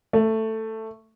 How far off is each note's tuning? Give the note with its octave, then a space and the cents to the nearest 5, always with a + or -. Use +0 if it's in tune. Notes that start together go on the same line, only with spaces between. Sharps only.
A3 +10